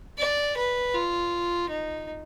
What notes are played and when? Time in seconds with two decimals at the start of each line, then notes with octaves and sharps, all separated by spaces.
0.19 D5
0.57 B4
0.94 F4
1.69 D#4